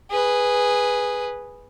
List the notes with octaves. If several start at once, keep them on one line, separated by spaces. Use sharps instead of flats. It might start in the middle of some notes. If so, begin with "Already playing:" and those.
G#4 B4